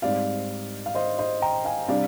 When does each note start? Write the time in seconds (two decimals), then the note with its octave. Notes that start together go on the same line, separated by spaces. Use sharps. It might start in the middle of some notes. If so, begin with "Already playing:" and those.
0.02 G#2 G3 C4 D5 F5
0.86 F5
0.95 C5 D#5
1.19 C5 D#5
1.42 G5 A#5
1.65 F5 G#5
1.88 C3 G3 D4 D5 F5